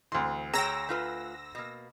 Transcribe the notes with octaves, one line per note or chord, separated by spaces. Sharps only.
D2 E3 C4 C6
G#4 C#5 G5 A#5 E6 A#6
A3 F4 B4
B2 A#3